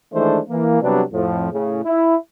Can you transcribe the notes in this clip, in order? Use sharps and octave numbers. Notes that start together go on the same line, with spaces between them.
D#3 E3 G#3 A3 D4 C5
E3 A#3
C3 F#3 G3 B3 D4
F2 A2 F3
A2 C#3
E4